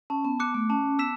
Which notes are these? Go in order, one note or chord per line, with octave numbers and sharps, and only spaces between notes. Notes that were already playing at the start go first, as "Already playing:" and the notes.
C#4 A5
B3
B3 D6 F#6 C#7
A3
C#4 A5
B3 E6 B6 E7